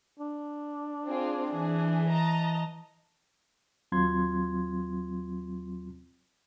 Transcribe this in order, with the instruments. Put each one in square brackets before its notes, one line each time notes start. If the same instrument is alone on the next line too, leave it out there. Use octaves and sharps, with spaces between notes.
[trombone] D4
[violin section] C4 F4 G#4
[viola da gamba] E3 [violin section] G#4
[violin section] D#5 A5 A#5
[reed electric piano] D#2 F#3 C4 F4 C6 G#6